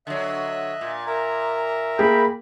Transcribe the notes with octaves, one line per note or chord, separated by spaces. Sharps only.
D3 F#3 D#5 E5 F#6
A#2
A#4 E5 A#5
A#3 G#4 G5 B5